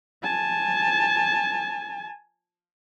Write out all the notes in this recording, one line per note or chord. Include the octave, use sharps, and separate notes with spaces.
G#5 A5